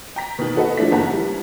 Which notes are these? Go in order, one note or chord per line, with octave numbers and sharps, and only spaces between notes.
G5 A#5 B6
B2 D#3
F#4 A4 B4 D#5 F#5
F3 G#3 A3 D4 E4 B6
F#1 D#2 F#5 A5 A#5
E3 G3